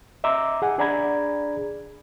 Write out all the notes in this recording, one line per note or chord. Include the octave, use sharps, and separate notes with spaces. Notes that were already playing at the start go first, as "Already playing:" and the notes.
D#5 E5 A#5 C6 D6 E6
G#4 F#5 G#5
D4 G#4 D5 A#5 B5 G#6